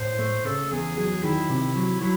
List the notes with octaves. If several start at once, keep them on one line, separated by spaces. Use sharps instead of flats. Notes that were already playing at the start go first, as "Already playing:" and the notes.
Already playing: A2 C5
A3
C#3 A4
E2 G#4
F#3 G#4
D#3 E4
C3
F#3
F#3 E4